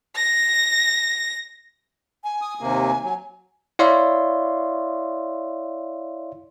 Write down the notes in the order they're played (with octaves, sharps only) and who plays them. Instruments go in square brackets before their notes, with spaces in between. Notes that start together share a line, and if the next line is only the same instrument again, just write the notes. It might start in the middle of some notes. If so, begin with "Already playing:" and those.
[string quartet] A#6
[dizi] G#5
[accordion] D#6
D#2 C3 A#3
F#3
[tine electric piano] E4 C#5 D5 E5 F5 C6